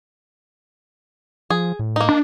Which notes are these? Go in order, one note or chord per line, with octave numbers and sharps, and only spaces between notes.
F3 G#4
A2
A#3 D#4
D4